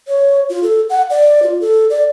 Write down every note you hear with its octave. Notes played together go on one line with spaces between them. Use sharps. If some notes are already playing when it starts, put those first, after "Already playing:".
C#5
F4
A4
F#5
D5
F4
A4
D5